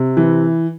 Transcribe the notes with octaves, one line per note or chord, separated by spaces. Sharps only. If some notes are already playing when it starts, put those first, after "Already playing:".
Already playing: C3
E3